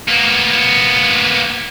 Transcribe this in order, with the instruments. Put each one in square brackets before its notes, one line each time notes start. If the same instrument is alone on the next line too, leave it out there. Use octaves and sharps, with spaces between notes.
[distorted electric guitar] A#3 B3